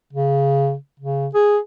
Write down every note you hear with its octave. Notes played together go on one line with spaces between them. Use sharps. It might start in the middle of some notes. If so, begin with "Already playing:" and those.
C#3
C#3
G#4